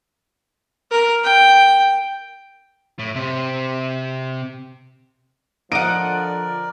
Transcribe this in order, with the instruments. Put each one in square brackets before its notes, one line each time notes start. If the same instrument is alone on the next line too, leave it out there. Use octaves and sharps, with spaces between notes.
[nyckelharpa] A#4
G5
[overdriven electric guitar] A2
C3
[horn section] D3 F3 [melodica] A#4 D5 [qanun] D#5 F#5 [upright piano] D7